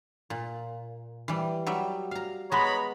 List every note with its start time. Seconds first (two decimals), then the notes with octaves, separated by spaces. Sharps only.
0.30 A#2
1.28 E3 G3
1.67 F#3 G3 E5
2.11 F5 A#5
2.52 G#3 B3 C#5 A#5 B5